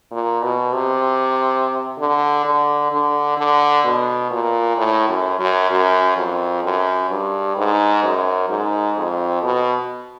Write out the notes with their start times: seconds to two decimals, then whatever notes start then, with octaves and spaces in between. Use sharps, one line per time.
0.12 A#2
0.43 B2
0.74 C3
1.99 D3
2.45 D3
2.92 D3
3.38 D3
3.85 B2
4.31 A#2
4.77 A2
5.09 F#2
5.39 F#2
5.71 F#2
6.17 F2
6.64 F#2
7.11 G2
7.57 G#2
8.03 F#2
8.50 G#2
8.97 F2
9.43 B2